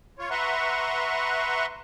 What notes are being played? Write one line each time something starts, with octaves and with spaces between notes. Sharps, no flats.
F4 C#5
B4 E5 F#5 A#5 C6 C#6